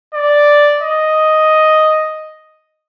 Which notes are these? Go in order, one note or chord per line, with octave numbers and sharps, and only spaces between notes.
D5
D#5